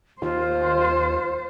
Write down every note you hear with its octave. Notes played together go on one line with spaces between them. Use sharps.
D#2 F4 C5